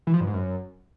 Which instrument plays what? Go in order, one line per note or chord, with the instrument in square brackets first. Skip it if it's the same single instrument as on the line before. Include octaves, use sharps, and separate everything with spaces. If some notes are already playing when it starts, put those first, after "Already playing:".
[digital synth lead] E3
F3
G2
G#2
F#2